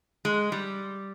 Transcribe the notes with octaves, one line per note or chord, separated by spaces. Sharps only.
G#3
G3